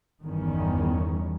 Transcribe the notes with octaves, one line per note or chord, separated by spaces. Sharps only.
G1 E2 D#3 G3 C#4